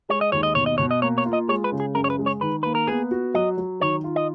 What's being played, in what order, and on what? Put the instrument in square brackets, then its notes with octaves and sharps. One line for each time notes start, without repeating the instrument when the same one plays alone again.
[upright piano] G#3 [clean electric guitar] C#5
[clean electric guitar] D#5
[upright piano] D#2 [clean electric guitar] C#5
[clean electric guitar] D#5
[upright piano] B2 [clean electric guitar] C#5
[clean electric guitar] D#5
[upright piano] B2 [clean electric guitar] C#5
[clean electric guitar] D#5
[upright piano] A#3 [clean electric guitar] C#5
[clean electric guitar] C#5
[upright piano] F4
[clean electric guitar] D#5
[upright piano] G#3 [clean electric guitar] C#5
[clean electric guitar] B4
[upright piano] C#3
[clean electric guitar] G#4
[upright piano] F#2 [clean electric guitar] A#4
[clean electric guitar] C#5
B4
[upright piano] G#3
[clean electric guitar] C#5
[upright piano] D#3 [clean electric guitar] B4
[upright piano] A#3 [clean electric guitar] B4
[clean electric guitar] A#4
[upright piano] B3 [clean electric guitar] G#4
[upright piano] F#4
[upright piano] F#3 [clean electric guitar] D#5
[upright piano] F#3
[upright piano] D#3 [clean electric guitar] C#5
[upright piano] F4
[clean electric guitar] D#5